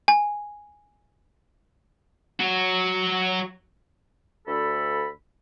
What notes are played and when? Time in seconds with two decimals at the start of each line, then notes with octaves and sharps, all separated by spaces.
0.08 G#5
2.40 F#3 F#4
4.48 D2 A4 B5